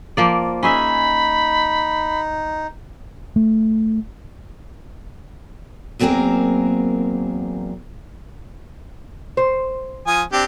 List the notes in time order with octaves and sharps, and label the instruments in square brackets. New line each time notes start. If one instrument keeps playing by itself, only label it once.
[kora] F3 A#3 D5
[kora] C#4 G#4 E5 [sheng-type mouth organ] D#4 [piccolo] B5
[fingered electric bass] A3
[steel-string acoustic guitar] E2 F#3 A#3 C4 G#4 A#4
[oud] C5
[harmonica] F3 G#5 D#6
C4 D4 G4